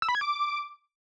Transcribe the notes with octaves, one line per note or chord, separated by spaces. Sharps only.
E6
B5
G#6
D6